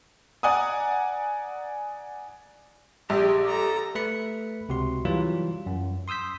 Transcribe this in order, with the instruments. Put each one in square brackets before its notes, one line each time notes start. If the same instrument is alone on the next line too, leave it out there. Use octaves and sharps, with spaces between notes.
[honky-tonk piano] D5 F#5 G#5 A#5 D#6
[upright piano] A#1 [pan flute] G4 [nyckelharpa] G#4 G5
[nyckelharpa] A4 A#5
[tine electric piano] A3 B4 B5 C#7
C#2 C3 F#4 C6
E3 F#3 G3 F4
F#2
C6 D#6 E6 G6 B6